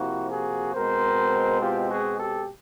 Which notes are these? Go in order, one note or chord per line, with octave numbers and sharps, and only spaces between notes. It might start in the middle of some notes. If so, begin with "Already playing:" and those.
Already playing: C3 F3 A#3 E4 F#4
F#4 G#4
B2 G#3 C4 A#4 C5
F4 G4
F#4 G#4
G4 A4